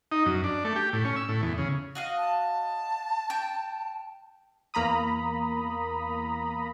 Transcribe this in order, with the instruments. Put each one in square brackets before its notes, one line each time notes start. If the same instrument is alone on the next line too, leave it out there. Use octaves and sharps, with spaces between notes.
[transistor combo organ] D#4
F#2
D4
A3
G4
A2
C#4
E6
A2
E2
C#3
[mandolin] F#4 D#5 F5
[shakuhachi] A5
[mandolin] G5
[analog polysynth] E2 A#3 A#5 B5 D#6